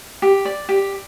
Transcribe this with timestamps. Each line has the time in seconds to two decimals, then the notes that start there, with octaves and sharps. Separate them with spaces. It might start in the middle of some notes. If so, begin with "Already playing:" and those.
0.22 G4
0.45 D5
0.69 G4